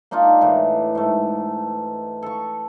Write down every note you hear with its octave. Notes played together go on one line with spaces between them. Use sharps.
A#3 D4 D#4 F4
A2 E3 B4
G#2 A3
A4 C#6